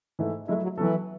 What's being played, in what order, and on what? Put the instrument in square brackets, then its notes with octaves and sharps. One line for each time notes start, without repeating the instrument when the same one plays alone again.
[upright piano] G#2 E3 A3 E4
[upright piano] F#3 A3 E4 [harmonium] G#3
[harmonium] F#3
[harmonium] E3 [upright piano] F#3 B3 F#4 A4